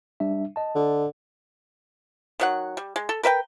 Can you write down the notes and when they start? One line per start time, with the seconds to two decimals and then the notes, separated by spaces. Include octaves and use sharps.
0.20 G3 D4 E5
0.56 D#5 A5
0.76 D3
2.40 D#3 F#3 F#5
2.77 G3
2.96 G#3
3.09 A4
3.23 A#4 B4 E5 G5